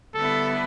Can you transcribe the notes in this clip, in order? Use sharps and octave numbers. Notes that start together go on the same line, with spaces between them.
D3 G3 B3 E4 A4